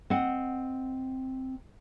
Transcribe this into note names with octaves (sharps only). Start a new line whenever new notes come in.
C4 D#5 F#5